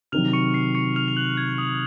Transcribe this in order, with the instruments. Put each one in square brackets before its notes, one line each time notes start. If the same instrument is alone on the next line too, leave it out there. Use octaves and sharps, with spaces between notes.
[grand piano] C3 D#3 F#3 [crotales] F6 F7
[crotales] C#6 C#7
C7
C#6 C#7
F6 F7
F7
F#6 F#7
G#6
D#6